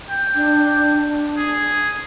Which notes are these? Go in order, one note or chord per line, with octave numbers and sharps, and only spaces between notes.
G5
D4
G#4